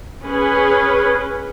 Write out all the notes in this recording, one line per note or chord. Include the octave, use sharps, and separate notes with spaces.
C#4 G#4 B4